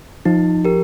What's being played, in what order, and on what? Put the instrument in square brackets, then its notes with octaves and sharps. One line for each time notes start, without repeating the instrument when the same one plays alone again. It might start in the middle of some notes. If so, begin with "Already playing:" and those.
[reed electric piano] F3 [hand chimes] D#4
[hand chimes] G4 A#4